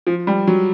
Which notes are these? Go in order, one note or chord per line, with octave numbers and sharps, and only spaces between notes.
F3
G3
F#3